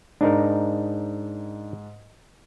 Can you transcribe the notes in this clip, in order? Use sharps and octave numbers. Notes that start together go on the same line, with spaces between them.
G#2 D4 D#4 A#4